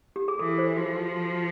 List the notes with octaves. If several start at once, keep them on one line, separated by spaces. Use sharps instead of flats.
G4
G#4
E3 A4
C5
F3 F#4
F#4